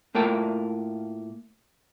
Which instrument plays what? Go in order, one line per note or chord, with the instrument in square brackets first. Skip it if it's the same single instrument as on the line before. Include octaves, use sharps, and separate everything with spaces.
[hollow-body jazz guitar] A2 A3 A#3 F4 G5 A5